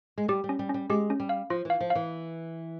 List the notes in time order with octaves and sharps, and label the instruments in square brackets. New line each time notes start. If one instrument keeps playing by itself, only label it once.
[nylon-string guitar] G#3
[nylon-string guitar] G3 [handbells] G4
[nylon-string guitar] G3
[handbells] C#4
[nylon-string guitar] G3
[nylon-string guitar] G3 [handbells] C#4
[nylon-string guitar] G#3 [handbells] G4
[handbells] C#4
[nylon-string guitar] G3
[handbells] F5
[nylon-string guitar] F3 [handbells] F4
[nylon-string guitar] E3 [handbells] F5
[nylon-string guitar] F3
[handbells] F5
[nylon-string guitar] E3